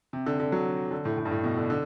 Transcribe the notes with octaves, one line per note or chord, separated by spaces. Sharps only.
C3
D3
D3
F#3
D3
A2
A2
G2
A2
B2
D3
D3